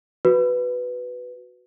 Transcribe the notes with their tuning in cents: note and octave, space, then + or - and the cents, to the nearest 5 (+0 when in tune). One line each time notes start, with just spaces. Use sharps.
F#4 +0 B4 +5